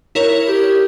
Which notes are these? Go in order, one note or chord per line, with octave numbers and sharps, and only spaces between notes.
E4 A#4 C#5
G4